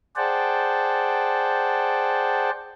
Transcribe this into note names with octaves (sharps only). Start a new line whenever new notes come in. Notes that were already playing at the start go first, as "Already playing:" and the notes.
G#4 C5 D5 F#5 G5 A5